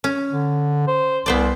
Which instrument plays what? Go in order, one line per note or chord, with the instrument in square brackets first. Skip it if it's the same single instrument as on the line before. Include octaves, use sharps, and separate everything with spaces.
[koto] C#4
[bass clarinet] D3
C5
[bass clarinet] C2 [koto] B3 C5 D5